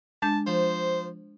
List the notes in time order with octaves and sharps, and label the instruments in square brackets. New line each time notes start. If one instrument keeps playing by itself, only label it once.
[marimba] G#3 D4 G6 [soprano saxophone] A5
[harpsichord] F3 [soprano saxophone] C5